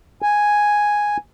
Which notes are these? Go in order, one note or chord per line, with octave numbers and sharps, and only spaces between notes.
G#5